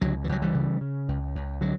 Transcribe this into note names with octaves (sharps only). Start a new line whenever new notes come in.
C#2 D3 F#3
E3
C#2 F#3
E3 G3
C#3
C#3
C#2
C#2
D3 F#3